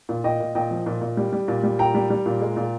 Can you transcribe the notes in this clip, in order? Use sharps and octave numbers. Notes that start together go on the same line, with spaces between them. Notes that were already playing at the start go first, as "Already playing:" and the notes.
A#2
A#2 D#5 G5
A#2
A#2 D#5 G5
F3
A#2
A#2
G3
G3
A#2
G3
A#2 G5 A#5
G3
G3
A#2
G#3
A#2